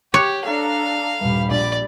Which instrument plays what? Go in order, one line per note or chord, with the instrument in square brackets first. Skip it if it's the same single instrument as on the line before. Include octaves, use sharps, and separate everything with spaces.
[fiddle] G4 [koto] C#5 [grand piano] D6 F#6
[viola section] D4 A4 A#5 [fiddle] F5
[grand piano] D#1 G2 [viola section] G3 B5
[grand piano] A#1 [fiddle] D5